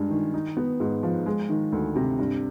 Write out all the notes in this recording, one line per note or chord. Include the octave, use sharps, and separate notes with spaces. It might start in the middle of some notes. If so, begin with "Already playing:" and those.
Already playing: G2 G#3
D#3
D#4
B3
G#2
F3
G#3
D#3
D2
C3
G2